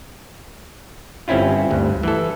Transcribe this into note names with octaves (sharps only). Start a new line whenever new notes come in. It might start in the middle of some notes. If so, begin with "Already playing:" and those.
G1 C4 C#4 E4 F4
D2 G2
E3 A4